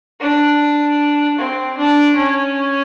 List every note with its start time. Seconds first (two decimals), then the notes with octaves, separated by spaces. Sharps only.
0.21 D4
1.38 C4
1.77 D4
2.16 C#4